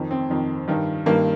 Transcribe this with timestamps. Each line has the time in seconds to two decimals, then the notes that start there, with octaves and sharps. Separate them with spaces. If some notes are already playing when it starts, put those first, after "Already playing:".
Already playing: F2 D#3
0.11 C4
0.30 F2 D#3
0.68 G2 D#3
1.06 G2 D#3 A#3